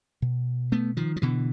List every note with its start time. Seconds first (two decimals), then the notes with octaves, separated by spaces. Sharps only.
0.22 B2
0.72 A3 B3
0.97 D#3 F3
1.16 F3
1.22 B2 D3 E3